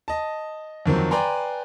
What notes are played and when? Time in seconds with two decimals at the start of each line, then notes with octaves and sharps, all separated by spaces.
0.08 D#5 A5
0.86 F2 D#3 F#3 C4
1.11 B4 D5 G5 G#5 A#5 C6